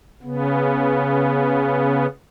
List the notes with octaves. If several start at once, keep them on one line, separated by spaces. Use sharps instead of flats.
C#3 B3